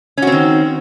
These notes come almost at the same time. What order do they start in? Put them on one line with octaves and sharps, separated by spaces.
C#4 F#4 C4 D#3